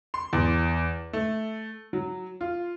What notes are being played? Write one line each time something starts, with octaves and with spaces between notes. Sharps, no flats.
C6
E2
A3
F#3
F4